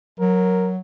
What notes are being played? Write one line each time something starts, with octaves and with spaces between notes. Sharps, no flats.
F#3 A#4